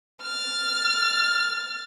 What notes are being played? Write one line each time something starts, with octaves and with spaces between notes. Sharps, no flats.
F6 A6